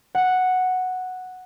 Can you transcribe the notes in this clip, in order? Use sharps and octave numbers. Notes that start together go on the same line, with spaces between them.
F#5